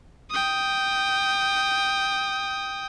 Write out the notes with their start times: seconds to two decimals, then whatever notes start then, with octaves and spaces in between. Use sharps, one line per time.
0.31 G5 D#6